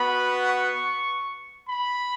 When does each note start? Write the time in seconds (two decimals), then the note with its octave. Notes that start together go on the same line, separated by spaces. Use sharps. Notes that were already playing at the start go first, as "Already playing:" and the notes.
Already playing: B3 F#4 B5
0.49 C#6
1.69 B5